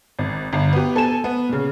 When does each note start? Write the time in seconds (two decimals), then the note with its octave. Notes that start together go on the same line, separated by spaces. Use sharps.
0.19 G#1
0.53 G1
0.73 B3 G4
0.94 B2 A4 G#5 E7
1.24 B3
1.49 A#2 C#3